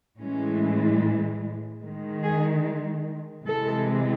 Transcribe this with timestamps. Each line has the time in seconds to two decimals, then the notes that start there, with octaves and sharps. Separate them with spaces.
0.18 A2 E3 G#3 C#4
1.81 D#3 G#3
2.23 G#4
3.44 C3 E3 G#3 A4